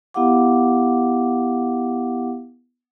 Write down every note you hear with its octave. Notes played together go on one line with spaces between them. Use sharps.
B3 E4 G4 F5 F#5 D6